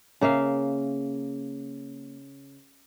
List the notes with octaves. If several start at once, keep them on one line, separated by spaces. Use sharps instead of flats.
C#3 A#3 E5 F5